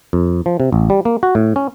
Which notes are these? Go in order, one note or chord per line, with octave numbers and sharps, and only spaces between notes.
F2
F3
C3
A1
G3
A#3
F#4
A2
C#4